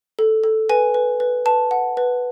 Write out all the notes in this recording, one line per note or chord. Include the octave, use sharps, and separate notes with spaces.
A4
A4
B4 G#5
B4
B4
B4 A5
F#5
B4